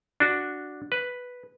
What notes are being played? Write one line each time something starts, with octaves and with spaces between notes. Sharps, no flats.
D4 F#4
B4